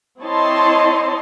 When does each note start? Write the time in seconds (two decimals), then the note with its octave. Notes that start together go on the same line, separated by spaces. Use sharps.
0.21 C4 E4 C#5 D#5 A5 C6